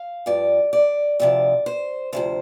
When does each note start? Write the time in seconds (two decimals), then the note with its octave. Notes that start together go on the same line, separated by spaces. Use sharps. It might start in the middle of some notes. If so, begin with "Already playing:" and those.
Already playing: F5
0.26 G2 F3 D5
0.73 D5
1.20 D2 C3 F3 D5
1.66 C5
2.13 D2 C3 F3 C5